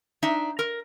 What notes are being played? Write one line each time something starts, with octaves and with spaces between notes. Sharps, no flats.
D4 D#4 E5
A#4